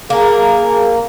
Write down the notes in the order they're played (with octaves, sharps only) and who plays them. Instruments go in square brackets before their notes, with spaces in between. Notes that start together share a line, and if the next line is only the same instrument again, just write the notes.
[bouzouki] A#3 [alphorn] G#4